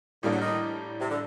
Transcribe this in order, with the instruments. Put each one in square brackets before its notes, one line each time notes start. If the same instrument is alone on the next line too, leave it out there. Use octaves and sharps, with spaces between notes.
[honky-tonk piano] A2 G3 A#3 D4 [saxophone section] D#3
[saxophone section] F#3
D#3
C3
D3